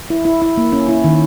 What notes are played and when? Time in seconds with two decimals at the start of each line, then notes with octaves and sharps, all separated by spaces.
0.10 E4
0.25 E4
0.42 E4
0.57 A#3
0.72 C#4
0.89 E4
1.04 D#3